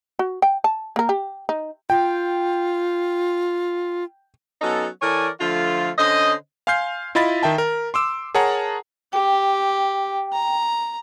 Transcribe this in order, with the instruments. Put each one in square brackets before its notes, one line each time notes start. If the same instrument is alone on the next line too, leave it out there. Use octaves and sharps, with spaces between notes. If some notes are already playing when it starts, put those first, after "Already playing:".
[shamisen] F#4
G5
A5
A#3 A#4
G4
D#4
[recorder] F4 [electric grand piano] G5
[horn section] F#3 B3 C#4 D#4 A4
E3 A4 A#4 C#5 D5 G#5
D3 F3 A3 F4
D3 C#4 C5 D#5
[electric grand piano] F5 G#5 C6 F6 G6 C7
E4 F4 D#5 B5 A6 B6
D#3 E5 G5 A5
A#4
C6 D6 E6
G#4 A#4 C#5 F#5 A5 A#5
[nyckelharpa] G4 [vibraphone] G5
[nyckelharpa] A#5